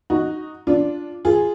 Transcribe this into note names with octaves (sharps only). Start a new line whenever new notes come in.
D#4 F#4
D4 F4
F4 G#4